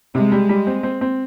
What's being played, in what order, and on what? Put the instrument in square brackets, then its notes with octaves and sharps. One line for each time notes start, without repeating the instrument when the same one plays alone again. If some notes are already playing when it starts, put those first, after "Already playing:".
[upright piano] C3 [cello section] G#3
[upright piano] G3
G3
C4
C4
C4